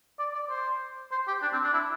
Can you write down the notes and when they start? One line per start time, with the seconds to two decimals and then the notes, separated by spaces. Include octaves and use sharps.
0.19 D5
0.35 D5
0.50 C5
1.12 C5
1.28 G4
1.42 D4
1.53 C4
1.64 D4
1.74 E4